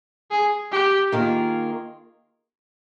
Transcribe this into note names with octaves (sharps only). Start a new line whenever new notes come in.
G#4
G4
D#3 A#3 F4 G#4